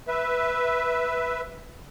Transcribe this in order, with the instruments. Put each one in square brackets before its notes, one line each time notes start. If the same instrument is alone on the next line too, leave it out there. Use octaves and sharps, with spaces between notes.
[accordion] B4 E5